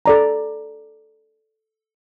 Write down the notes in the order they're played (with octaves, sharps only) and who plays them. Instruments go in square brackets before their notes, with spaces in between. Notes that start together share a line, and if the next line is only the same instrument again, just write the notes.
[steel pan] A4 D5 A#5